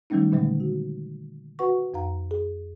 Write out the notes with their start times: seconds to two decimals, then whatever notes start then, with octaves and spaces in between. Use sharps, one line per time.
0.10 D#3 F#3 G3 A3 C#4 D#4
0.32 A#2 D3 F#3 G#3 A3
0.60 F#4
1.59 F#4 B4 F#5 C#6
1.94 F2 F5 A#5
2.31 G#4